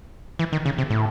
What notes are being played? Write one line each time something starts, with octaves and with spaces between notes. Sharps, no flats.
E3
D#3
C#3
C3
A2